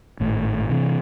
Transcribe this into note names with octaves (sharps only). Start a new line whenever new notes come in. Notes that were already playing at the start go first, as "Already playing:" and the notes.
G#1 A2
C3 E3